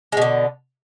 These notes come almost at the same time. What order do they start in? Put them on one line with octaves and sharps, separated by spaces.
G#3 B2 D3